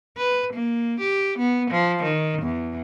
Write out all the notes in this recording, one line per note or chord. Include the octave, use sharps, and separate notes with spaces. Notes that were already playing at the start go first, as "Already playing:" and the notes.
B4
A#3
G4
B3
F3
D#3
E2